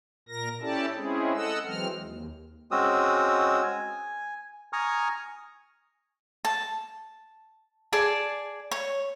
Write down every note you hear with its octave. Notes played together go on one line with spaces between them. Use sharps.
A#2 A#4 A#6
C#4 E4 G4 A4 D5 A5
G#3 C4 C#4 E4 G#4
A4 D#5 F#5 E6
E3 F#3 G#3 C4 F6
D#2
G#3 C4 C#4 F#4 D#6 E6
G#5
G#5 A#5 C#6 D#6 F6
A5
G#4 D5 A5
C#5